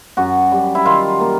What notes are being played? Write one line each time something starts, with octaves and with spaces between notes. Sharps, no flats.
F#2 F#4
G3
E4
D#3 F4
A#3